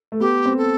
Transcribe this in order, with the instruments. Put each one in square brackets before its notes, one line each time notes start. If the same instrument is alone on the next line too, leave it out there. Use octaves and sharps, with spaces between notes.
[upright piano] A3
[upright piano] B3 [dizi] G4
[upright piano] C4
[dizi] A4